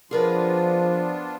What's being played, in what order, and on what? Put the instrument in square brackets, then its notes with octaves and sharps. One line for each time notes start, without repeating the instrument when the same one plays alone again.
[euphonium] F3 [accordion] B3 D4 F4 [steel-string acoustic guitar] G#4 A#4 B4